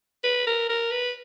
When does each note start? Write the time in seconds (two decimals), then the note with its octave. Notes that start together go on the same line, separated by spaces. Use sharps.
0.24 B4
0.47 A#4
0.69 A#4
0.91 B4